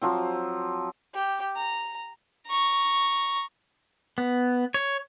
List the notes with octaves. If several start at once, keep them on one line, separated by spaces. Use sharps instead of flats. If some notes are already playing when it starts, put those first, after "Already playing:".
F3 F#3 C4
G4
A#5
A#5 C#6
B3
C#5